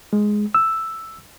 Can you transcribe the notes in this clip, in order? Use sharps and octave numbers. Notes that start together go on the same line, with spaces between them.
G#3
E6